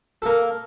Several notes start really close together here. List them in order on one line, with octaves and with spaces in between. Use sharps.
A4 A#3 A#4